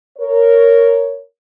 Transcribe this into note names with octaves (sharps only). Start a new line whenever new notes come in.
A#4 C#5